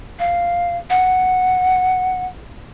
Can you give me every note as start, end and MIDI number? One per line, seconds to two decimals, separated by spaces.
0.19 0.77 77
0.90 2.26 78